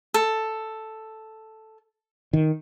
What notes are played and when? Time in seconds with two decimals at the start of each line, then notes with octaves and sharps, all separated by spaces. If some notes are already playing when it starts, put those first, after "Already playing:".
0.14 A4
2.33 D#3